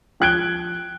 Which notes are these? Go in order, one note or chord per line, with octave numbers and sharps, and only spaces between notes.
F3 G5 F#6 G#6 D7 G7